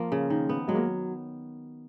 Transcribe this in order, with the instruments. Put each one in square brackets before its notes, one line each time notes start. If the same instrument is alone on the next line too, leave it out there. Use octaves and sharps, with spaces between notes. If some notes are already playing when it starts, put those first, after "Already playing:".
Already playing: [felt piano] F3 [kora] A#3 F4
[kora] C#3
D#3
B3
[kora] F#3 [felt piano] G#3
[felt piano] A#3